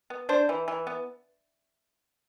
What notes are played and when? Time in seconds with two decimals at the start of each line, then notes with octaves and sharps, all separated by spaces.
0.10 B3
0.29 D4 C5
0.49 E3
0.68 E3
0.87 B3